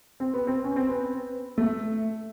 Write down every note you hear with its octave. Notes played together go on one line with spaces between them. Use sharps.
C4
B3
C4
C#4
C4
B3
A3